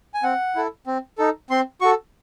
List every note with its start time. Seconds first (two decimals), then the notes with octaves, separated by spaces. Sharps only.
0.14 G#5
0.23 C4 F#5
0.55 E4 A4
0.87 C4
1.18 D#4 A4
1.50 C4 C6
1.81 F#4 A4 C#6